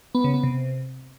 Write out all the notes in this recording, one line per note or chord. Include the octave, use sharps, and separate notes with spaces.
B3
C#3
B3
C3